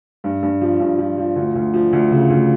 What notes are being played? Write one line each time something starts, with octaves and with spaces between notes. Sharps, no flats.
G2
G2
F3
G2
F3
F3
D2
D2
F3
D2
C#3
D2